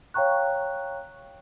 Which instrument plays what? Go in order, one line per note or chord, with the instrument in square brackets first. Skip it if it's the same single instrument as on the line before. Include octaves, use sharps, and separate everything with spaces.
[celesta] C#5 F5 G5 A#5 C#6 F#6